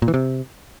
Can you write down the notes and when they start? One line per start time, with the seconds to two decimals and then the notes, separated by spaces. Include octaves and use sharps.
0.02 A#2
0.08 E3
0.14 C3